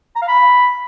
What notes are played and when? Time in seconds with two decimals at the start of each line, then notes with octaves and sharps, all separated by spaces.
0.16 A#5
0.22 F5
0.28 B5